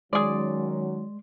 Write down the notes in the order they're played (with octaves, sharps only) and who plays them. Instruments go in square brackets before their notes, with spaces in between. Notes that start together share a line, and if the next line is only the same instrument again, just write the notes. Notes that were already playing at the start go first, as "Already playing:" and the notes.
[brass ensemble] D#3 F#3 C#4 [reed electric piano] G#3 C6 [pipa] G#4 D5